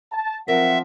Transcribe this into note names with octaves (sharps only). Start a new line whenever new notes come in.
A5
F3 F#3 C4 A#4 E5 F#5